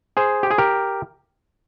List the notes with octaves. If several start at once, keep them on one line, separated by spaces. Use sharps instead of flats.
G#4 C5
G4
G#4
G4 A#4